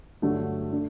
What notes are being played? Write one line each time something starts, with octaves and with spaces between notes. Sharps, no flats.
G2 D3 F#3 A3
A3 D4